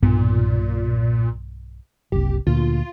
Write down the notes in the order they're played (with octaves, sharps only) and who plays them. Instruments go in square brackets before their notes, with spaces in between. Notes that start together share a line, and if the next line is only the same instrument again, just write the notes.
[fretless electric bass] B1 G2 B3 [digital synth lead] A#2
[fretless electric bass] F#1 C2 [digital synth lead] G4
[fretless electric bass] D2 A#2 [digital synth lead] F4